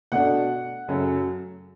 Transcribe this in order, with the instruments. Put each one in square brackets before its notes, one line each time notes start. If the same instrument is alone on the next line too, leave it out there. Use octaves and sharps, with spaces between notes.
[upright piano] B2 A3 D4 F#5
F#2 C#3 F#3 A3 C#4